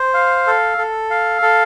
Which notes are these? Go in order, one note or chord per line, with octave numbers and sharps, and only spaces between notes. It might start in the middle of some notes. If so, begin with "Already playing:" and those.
Already playing: C5
F5
A4
A4
F5
A4